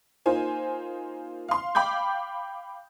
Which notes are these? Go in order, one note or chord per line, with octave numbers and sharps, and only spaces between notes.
A#3 D#4 F4 C5 G#5
F5 C6
F5 G5 B5 D6 G6